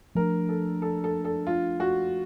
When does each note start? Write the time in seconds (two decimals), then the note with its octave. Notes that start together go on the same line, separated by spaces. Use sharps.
0.15 F3 A3 D4 A#4
0.49 A4
0.82 A4
1.04 A4
1.25 A4
1.47 F4
1.80 F#4